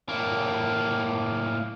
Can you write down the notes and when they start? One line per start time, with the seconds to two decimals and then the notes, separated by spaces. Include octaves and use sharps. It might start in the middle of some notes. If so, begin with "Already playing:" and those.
0.09 A2 A#3